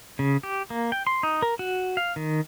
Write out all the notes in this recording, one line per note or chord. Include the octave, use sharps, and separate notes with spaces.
C#3
G4
A#3
G5
C6
D#4
A#4
F#4
F5
D#3